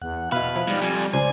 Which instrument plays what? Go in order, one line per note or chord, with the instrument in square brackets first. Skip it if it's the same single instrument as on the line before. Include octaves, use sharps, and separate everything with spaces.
[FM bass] E2 [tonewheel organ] F#5
[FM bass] B2 [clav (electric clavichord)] B3 E4 [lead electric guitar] B4 [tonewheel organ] F5
[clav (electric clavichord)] F3 E4
[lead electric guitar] G#2 [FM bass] G3
[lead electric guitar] F2 [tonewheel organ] G#5
[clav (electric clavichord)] C#2 [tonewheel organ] C5 D5 [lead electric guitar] G#5